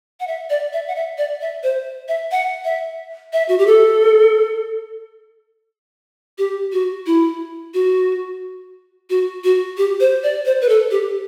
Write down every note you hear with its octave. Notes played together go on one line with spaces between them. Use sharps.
F#5
E5
D5
E5
F#5
E5
D5
E5
C5
E5
F#5
E5
E5
F#4
G4
A4
G4
F#4
E4
F#4
F#4
F#4
G4
C5
D5
C5
B4
A4
G4